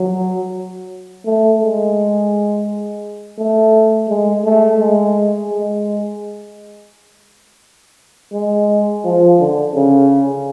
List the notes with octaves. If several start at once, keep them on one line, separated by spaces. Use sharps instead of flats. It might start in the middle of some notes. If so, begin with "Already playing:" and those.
Already playing: F#3
A3
G#3
A3
G#3
A3
G#3
G#3
G#3
F3
D3
C#3